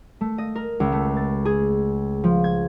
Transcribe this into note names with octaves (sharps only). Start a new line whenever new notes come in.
A3
D#5
A#4
C#2
A3
A6
G#4
F3
G#6